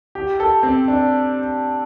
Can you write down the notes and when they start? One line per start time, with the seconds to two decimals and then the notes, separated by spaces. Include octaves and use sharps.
0.15 G4
0.40 A4
0.63 C4
0.88 D4